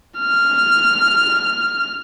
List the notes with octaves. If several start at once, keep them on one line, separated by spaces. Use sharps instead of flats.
F6